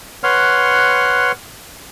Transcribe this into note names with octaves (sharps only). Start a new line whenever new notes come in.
B4 C#5 F#5 C6 F6